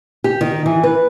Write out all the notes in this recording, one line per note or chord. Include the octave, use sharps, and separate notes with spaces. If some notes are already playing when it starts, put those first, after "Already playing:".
G4
D#3
E3
B4